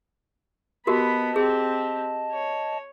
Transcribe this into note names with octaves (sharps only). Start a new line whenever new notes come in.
B3 F#4 G4 A#4 D#5 A5 B5
C4 G4 G#4
C#5